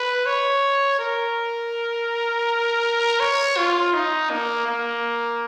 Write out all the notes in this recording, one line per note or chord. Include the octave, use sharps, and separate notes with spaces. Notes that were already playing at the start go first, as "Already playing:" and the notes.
Already playing: B4
C#5
A#4
C#5
F4
D#4
A#3
A#3